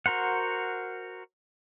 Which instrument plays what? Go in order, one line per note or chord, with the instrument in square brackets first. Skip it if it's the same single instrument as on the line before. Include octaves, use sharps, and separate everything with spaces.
[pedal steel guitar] F#4 A#4 C5 F#5